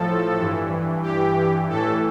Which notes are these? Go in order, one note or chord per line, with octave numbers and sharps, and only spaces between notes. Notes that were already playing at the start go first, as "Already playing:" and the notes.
Already playing: A2 F3 A4
G2 E3
G4
A2 E3 A4